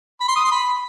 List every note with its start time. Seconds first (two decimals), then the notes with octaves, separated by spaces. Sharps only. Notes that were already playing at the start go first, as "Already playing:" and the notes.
0.21 B5
0.28 C6
0.36 D#6
0.44 C6
0.52 B5